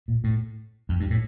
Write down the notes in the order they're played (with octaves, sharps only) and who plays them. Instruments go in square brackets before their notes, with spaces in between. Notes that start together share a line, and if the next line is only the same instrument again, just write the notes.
[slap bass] A#2
A2
F2
G2
A2